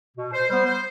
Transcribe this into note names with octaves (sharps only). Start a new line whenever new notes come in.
B2
C5
G3 B3 C5
C5